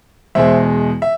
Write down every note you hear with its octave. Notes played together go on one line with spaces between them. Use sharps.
E2 B2 G#3 C5 E5
E5